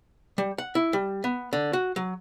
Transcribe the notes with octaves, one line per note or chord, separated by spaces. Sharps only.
G3
F#5
E4
G3
B3
D3
F#4
F#3